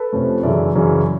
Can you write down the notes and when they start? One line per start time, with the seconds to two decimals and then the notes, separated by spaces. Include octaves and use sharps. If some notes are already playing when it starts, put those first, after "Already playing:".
Already playing: A4 B4
0.12 F2 C3 F3 A3 C#4
0.43 F#2 C#3 E3 D5 E5
0.75 F#2 C#3 E3